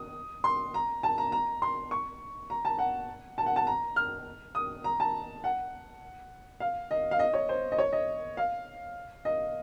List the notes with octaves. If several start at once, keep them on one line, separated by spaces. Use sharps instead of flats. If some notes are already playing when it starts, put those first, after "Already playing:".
Already playing: D#6
C6
A#5
A5
A#5
A#5
C6
C#6
A#5
A5
F#5
A5
F#5
A5
A#5
F6
D#6
A#5
A5
F#5
F5
D#5
F5
D#5
C#5
C5
D#5
C#5
D#5
F5
D#5